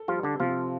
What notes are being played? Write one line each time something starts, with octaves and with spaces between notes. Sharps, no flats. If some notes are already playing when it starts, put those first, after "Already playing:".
Already playing: A4
F3 G3 F4
D3 D4
C3 F3 F4